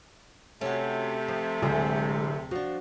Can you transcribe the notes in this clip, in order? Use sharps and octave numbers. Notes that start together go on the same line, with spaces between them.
C3 A3 C#4 F#4
F3
D1 D2 G#3 C4 G#4
F3 D4 F#4